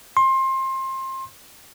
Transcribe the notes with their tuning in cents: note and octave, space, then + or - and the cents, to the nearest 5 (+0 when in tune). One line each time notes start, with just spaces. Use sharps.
C6 +25